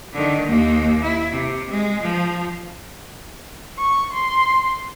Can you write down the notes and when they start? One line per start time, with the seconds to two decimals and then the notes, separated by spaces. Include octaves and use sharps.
0.13 D3 D#3
0.47 D#2 A#3
1.02 E4
1.32 C3
1.70 G#3
2.02 F3
3.77 C#6
4.13 C6